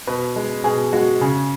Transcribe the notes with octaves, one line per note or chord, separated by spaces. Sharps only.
B2 B4
G#3
B2 G#4
G#3 F#4
C#3 G#4